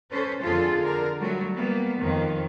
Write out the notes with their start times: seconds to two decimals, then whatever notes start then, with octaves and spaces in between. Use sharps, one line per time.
0.11 C#4 A4 B4 C5
0.41 F2 D3 F4 G#4 A4
0.79 D3 A#4
1.21 F#3 G3 A3 F#4
1.54 G3 A#3 B3
2.00 F2 D#3 F3